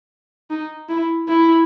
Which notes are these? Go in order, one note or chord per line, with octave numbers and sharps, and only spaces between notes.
D#4
E4
E4